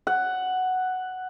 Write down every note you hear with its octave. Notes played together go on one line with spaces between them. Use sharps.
F#5